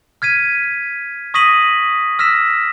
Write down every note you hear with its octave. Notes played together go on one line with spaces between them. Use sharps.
F6 G#6 B6 D#7
C#6 D#6 A#6 B6 D#7 F#7
E6 F6 A#6 B6 E7